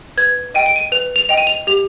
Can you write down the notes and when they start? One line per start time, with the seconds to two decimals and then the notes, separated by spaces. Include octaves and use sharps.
0.17 B4 G#6
0.54 D#5 G5 D#7
0.66 D7
0.76 D#7
0.92 B4 F7
1.16 F7
1.29 D#5 G5 F7
1.37 D#7
1.47 F7
1.67 G4 F7